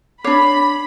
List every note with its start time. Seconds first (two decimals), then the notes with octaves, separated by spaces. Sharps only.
0.24 D4 C#5 B5 D6 C7